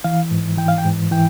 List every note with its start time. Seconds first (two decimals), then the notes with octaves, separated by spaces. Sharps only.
0.04 E3 F5
0.31 G#2
0.57 E3 G5
0.68 F5
0.78 G5
0.85 G#2
1.11 E3 G5